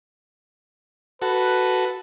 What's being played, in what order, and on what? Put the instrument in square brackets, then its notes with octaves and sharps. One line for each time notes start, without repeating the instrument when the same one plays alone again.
[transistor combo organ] F#4 A4 [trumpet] B4